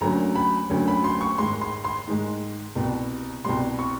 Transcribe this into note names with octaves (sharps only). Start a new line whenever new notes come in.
D2 D3 F#3 A#3 C#4 A#5
B5
D2 D3 F#3 A#3 C#4
B5
C6
C#6
G#2 D#3 G#3 C6
C6
C6
G#2 D#3 G#3
C2 B2 G3
C2 B2 G3 C6
C#6